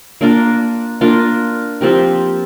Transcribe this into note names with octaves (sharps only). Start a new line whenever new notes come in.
A#3 D4 F4 A#4
A#3 D4 F4 A#4
F3 C4 G4 A#4